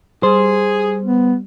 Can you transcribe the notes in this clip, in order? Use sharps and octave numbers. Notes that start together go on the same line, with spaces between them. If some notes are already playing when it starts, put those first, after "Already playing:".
G3 G#4 C5
B3